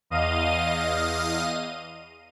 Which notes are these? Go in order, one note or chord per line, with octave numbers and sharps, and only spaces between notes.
E2 D#5 F5 D#7